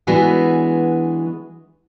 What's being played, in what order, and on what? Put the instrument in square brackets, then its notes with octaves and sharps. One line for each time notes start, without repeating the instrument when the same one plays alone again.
[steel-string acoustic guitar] E3 G#3 B3 D4 F#4 G#4